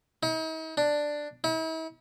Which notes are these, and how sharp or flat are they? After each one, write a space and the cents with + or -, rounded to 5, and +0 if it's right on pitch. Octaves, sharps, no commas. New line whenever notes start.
D#4 +45
D4 +5
E4 -45